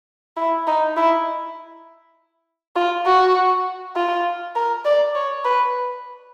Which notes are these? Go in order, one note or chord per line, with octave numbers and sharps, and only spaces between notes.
E4
D#4
E4
F4
F#4
F4
A#4
D5
C#5
B4